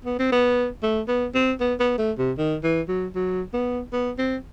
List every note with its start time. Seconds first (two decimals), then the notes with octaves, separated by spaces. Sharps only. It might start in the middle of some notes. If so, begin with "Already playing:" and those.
0.05 B3
0.19 C4
0.32 B3
0.83 A3
1.08 B3
1.34 C4
1.60 B3
1.80 B3
1.98 A3
2.18 C3
2.37 D#3
2.63 E3
2.89 F#3
3.15 F#3
3.54 B3
3.92 B3
4.18 C4